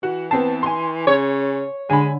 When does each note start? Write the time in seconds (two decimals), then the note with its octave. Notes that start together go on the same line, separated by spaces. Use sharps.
0.03 E3 F#4
0.31 B3 C4 A5 C7
0.63 G#5 C6
1.07 C#3 C#5
1.90 D3 G#3 G#5 B5